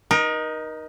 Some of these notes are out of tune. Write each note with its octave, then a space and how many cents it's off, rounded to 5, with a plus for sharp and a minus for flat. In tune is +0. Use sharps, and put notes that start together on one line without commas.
D#4 +0 A#4 +35